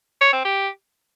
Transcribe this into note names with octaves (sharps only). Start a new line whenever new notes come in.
C#5
C4
G4